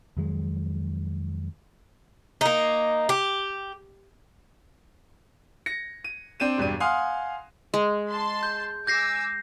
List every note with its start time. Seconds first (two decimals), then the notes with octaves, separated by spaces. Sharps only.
0.17 F2 D#3 F#3 G#3
2.41 A#3 D#4
3.09 G4
5.66 A#6 C#7
6.04 D#7
6.40 C4 D4 D#7 E7
6.58 E1 G2 D4 D#7
6.80 F5 F#5 G#5 C6 D#6 F6
7.74 G#3
8.09 A5 C6
8.43 G6
8.87 G#5 D6 E6 G6 A#6 C7